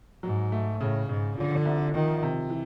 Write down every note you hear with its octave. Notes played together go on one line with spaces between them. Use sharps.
G#2 F#3
A3
A2 C#3
G#2 C#3
D3 F3
C2
D#3 F3
C3
E3